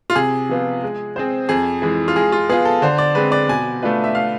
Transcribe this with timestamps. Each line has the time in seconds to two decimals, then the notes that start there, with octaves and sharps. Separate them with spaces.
0.10 F4
0.15 C3 G#4
0.49 F3 B3 F4
0.83 G#3
1.16 C4 G#4 C5
1.49 F2 G#4
1.82 E3 G#3
2.08 F4
2.16 G#3 G#4
2.32 F4
2.49 B3 F4 G#4
2.65 A4
2.82 D3 C5
2.98 D5
3.15 G#3 C4 B4
3.32 D5
3.49 B2 G#5
3.82 A3 D4 F4 B4
4.04 E5
4.15 F5